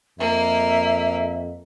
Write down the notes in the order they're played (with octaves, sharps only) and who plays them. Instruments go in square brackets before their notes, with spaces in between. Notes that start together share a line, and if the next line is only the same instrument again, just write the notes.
[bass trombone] F2 [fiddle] A#3 [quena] E5